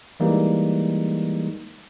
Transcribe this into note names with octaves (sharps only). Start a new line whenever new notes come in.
E3 G3 G#3 A#3 D#4